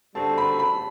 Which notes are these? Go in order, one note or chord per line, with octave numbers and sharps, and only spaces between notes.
D3 G3 C4 F#4 A4 A5
B5
B5